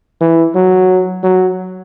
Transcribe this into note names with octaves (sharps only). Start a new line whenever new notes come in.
E3
F#3
F#3